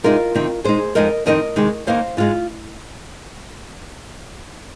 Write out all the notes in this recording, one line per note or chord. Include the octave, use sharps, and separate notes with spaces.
C3 G#3 C4 D#4 F4 A#4
C3 D#3 C4 D#4
A#2 G#3 D#4 G#4 C5
F2 F3 G#3 D#4 A#4 D#5
F2 D#3 C4 D#4 A#4 D#5
C3 D#3 G#3 D#4
D#2 D#3 A#3 D#4 C5 F5
G#2 G#3 D#4 F4